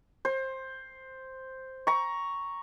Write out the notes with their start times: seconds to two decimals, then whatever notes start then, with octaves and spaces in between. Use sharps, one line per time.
0.25 C5
1.87 A#5 C#6